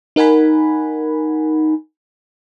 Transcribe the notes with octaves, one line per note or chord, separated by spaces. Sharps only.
D#4 A#4 F#5 G#5 B5